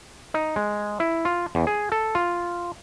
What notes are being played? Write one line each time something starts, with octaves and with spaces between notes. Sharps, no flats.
D#4
G#3
E4
F4
E2
G#4
A4
F4